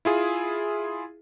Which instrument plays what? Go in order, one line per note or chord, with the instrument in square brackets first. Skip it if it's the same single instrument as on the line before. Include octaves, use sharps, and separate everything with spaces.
[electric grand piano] E4 F4 G#4